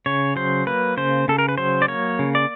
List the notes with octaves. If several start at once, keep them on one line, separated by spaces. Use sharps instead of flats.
C#3 C#5
F#3 C5
A#3 B4
C#3 C5
C#3 A4
A#4
B4
F#3 C5
D5
A#3 C#5
C#3
D5